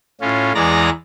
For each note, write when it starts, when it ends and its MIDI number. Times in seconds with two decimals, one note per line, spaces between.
0.21 0.52 45
0.21 0.52 61
0.21 0.52 65
0.55 0.90 40
0.55 0.90 52
0.55 0.90 56
0.55 0.90 74
0.55 0.90 82
0.55 0.90 94